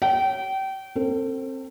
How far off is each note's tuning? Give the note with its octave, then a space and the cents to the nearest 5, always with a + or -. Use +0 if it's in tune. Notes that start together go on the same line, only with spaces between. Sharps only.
C#5 +0 G5 -30
C4 +25 A4 +35